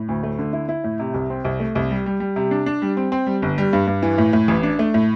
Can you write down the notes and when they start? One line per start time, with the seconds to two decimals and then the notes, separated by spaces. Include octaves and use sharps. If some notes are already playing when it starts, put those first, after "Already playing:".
Already playing: A2
0.08 D2
0.23 A3
0.39 D3
0.53 E4
0.69 E4
0.84 A2
0.99 C3
1.14 C2
1.30 C4
1.45 C2
1.60 A3
1.75 C2
1.91 G3
2.06 G3
2.20 G3
2.36 C3
2.51 D4
2.66 D4
2.82 G3
2.97 C4
3.12 C4
3.27 G3
3.42 G1
3.58 G3
3.73 G2
3.87 G2
4.03 E3
4.18 A2
4.33 A2
4.48 A1
4.63 D4
4.79 A3
4.94 A2